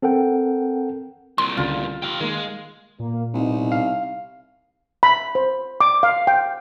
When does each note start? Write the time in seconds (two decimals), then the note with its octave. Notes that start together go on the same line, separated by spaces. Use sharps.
0.02 C4 A4 A#4 F#5 G5
1.38 C2 A#2 C6
1.57 C#2 D3 F4
2.02 G4 F5
2.20 D#3 G#3 A#3
3.00 A#2 A#3
3.34 C2 B2 D#4
3.72 F5
5.03 B5
5.35 C5
5.81 D6
6.03 F5
6.27 G5